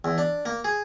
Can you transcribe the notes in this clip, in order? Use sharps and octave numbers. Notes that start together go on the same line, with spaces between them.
E2
D4
A#3
G#4